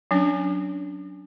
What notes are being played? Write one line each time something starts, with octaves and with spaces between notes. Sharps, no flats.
F#3 C#4 D4